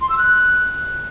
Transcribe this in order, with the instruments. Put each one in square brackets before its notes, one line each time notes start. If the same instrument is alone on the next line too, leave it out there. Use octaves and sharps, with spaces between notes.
[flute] C6
E6
F#6